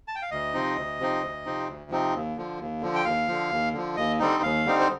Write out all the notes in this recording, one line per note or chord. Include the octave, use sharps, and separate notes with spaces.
A5
G5
F5
D2 D#5
C3 F3 C4 D#4
D2
C3 F3 C4 D#4
D2
C3 F3 C4 D#4
D2
C3 F3 C4 D#4
D#2
D3 F3
D#2
D3 F3
G5
D#2 F5
D3 F3
D#2
D3 F3
D#2 D#5
D3 G3 C4 D#4
D#2 F5
D3 G3 C4 D#4
C5